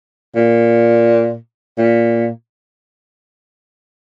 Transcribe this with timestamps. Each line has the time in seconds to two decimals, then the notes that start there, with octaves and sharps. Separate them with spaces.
0.36 A#2
1.78 A#2